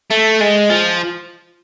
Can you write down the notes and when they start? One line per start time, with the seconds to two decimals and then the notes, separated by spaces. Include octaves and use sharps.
0.10 A3
0.40 G#3
0.70 F3